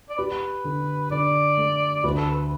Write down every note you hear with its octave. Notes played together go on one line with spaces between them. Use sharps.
D5
G4 B4
D3
D3 D5
A3
D2 B4
A4
B4